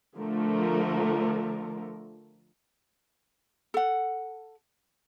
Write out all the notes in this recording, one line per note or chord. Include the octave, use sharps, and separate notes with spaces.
D3 F3 A3 A#4
A4 F#5